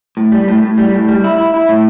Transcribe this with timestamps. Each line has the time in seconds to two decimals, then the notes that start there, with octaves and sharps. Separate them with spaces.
0.17 A2
0.32 G3
0.48 A2
0.63 A2
0.78 G3
0.94 A2
1.08 G3
1.24 E4
1.38 E4
1.54 E4
1.69 A2